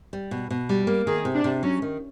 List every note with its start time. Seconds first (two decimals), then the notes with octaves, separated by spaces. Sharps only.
0.13 G3
0.31 B2
0.50 B2
0.69 G3
0.87 A#3
1.06 D#3 G#4
1.25 C3
1.34 D4
1.44 C3
1.63 F#3 C#4
1.82 D#3